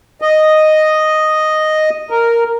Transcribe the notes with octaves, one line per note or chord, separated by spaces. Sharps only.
D#5
A#4